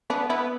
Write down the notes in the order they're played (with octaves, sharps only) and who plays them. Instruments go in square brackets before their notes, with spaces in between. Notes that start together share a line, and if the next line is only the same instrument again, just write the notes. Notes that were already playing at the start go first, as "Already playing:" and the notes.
[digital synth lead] B3 [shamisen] D4
[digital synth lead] B3 [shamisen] E4